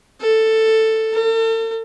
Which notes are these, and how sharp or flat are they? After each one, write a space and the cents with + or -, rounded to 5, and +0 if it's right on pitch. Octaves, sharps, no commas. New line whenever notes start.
A4 +10
A4 +40